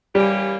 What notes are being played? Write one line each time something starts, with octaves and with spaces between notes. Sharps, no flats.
E3 G3 A#3 C#4 G4